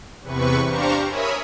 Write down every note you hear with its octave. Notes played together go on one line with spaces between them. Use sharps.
E2 C3 B4 C#6
D4 G4 C5 F5 A#5 C#6
A#4 C#5 E5 G#5 B5 D#6